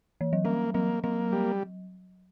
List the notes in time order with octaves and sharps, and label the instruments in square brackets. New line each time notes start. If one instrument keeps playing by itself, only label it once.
[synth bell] E3
F#3
[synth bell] G3 [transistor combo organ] A#3
[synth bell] F#3 [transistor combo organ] A#3
[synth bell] F#3 [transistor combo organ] A#3
[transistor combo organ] G3